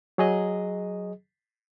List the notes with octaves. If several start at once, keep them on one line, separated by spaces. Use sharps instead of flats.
F#3 G#4 D#5